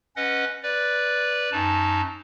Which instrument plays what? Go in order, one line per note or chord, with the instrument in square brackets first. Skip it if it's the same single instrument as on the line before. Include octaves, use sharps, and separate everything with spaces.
[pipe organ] C#4 B4 D#5 F#5
B4 D5
F#2 D#4 A5